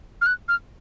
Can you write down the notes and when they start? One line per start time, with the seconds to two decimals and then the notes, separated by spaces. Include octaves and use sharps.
0.21 F6
0.26 F#6
0.48 F6